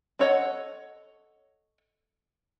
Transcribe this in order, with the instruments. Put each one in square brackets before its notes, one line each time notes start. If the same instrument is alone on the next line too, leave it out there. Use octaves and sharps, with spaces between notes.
[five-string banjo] D4 A4 C#5 D#5 F#5